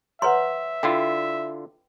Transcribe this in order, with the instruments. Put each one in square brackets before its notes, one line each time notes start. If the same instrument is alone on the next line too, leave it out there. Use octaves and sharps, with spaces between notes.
[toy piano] B4 C#5 C6 [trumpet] E5 [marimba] F#5 A#5
[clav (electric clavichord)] D3 E4 F4 [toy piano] G5